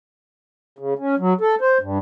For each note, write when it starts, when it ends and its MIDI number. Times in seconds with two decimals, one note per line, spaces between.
0.79 0.94 49
0.99 1.15 61
1.19 1.33 54
1.41 1.55 69
1.61 1.78 72
1.81 1.98 43